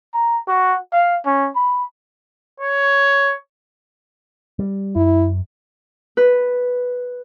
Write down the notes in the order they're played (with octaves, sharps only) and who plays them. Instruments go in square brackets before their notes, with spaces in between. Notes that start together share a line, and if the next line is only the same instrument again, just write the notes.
[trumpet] A#5
F#4
F5
C#4
B5
[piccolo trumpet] C#5
[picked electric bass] G3
[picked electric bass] F#2 [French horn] E4
[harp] B4